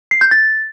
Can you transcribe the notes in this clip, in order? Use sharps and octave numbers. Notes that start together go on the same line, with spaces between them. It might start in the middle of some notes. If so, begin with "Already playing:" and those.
C7
G6
A6